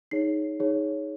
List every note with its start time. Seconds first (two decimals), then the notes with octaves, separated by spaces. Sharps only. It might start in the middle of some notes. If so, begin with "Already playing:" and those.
0.11 D#4 G#4 C#5 C7
0.60 D#4 G#4 C#5